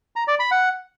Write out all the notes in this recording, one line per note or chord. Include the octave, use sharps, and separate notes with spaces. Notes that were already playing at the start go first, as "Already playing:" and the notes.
A#5
D5
B5
F#5